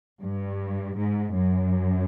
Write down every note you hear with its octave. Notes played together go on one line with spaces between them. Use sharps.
G2
G#2
F#2